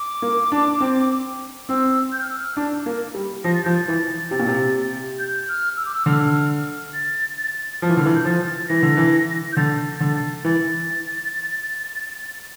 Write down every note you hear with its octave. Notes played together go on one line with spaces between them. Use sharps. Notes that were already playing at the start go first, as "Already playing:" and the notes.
Already playing: D6
A#3
D4
C4
C4 E6
G6
F6
E6
F6
D4
A#3
G3
F3 A#6
A6
F3 G6
A6
E3
C3 A6
A#2
C3
G6
F6
E6
D6
E6
D3 F6
A6
A6
F3 F6
E3
D3
E3
G6
F3 A6
E3 A#6
D3
E3
G6
D3 A6
D3
E3 A6